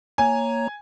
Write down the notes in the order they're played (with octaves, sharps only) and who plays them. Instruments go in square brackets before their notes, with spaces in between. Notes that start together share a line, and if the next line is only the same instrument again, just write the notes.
[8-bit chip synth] A#3 C#5 A#5 [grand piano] G#5